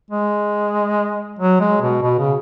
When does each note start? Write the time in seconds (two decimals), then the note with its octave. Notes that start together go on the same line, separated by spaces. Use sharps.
0.11 G#3
1.39 F#3
1.60 G#3
1.81 B2
2.02 B2
2.19 C#3